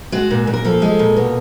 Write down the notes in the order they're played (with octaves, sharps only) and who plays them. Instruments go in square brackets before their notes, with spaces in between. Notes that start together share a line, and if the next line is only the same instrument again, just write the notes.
[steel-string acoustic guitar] G#3 F#4
A#2
A#2
A#4
F3 A4
G#3
A#2
B2